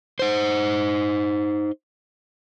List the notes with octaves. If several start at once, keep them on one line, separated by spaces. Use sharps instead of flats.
D#4 C5